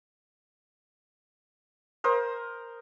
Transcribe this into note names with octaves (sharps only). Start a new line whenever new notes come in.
A#4 C5 D#6